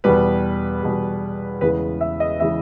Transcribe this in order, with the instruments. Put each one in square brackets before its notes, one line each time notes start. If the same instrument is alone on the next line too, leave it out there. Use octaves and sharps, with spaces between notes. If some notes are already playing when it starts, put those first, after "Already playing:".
[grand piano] E2 B2 G3 B4
E2 B2 G3
E2 C#3 E3 G#3 B4
E5
D#5
C#3 E3 G#3 E5